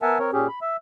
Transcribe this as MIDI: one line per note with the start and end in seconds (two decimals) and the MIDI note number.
0.02 0.18 59
0.02 0.18 70
0.02 0.18 76
0.02 0.18 78
0.02 0.18 80
0.02 0.18 81
0.19 0.31 60
0.19 0.31 70
0.19 0.31 73
0.33 0.47 46
0.33 0.47 61
0.33 0.47 67
0.33 0.47 68
0.48 0.59 83
0.62 0.77 76